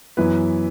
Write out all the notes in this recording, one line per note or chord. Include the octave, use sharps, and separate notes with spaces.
F#2 E3 B3 E4 B4